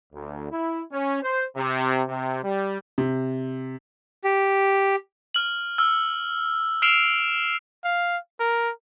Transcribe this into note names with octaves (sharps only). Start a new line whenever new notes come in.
D2
E4
C#4
C5
C3
C3
G3
C3
G4
F6 F#7
E6 F6
E6 F6 C7 D7 E7 F7
F5
A#4